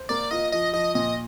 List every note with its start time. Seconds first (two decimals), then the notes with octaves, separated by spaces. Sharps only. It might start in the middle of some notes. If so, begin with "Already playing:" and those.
Already playing: C5
0.09 A#3 D5
0.31 F4 D#5
0.52 F3 D#5
0.73 F3 D#5
0.95 A#2 D#5